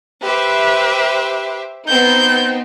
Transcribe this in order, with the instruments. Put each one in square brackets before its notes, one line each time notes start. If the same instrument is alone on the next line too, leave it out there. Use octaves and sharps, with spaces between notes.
[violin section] G4 C5 E5 [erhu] B4
[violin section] B3 C4 D#4 [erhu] G6